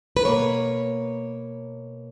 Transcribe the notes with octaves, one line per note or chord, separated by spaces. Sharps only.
B4
B2 A#3 C#5